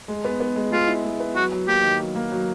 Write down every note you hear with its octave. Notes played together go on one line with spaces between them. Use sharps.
G#3
B3
B3
G#3
G#3 F4
E4
G#3
B3
F#3 F#4
F#3
A#3 G4
D#3
F#3
A#3
F#3